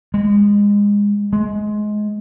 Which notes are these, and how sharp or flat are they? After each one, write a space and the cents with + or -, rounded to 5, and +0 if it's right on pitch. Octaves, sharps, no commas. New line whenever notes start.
G#3 -25
G#3 +20